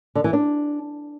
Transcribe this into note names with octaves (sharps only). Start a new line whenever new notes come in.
D3
E3
D4